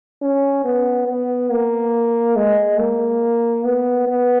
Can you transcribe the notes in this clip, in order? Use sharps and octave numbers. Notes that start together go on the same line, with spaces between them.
C#4
B3
B3
A#3
G#3
A#3
B3
B3